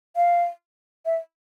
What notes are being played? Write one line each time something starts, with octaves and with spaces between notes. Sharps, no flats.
F5
E5